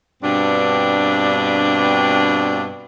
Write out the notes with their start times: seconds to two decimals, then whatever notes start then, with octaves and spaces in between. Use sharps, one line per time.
0.23 G2 B2 C4 D4